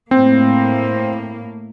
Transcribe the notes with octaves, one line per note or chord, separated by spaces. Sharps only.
A2 A#3 C4